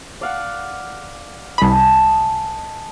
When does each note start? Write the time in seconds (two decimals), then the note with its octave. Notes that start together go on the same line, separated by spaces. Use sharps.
0.21 D5 F5 F#5
1.58 C2 D#5 G#5 A5 B5